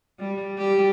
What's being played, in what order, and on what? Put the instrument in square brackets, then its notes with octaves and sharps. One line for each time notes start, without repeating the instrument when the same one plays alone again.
[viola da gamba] G3
G3 G4